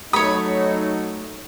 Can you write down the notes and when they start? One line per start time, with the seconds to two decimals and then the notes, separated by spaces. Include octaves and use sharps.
0.13 F#3 A3 D#4 C#5 B5 D#6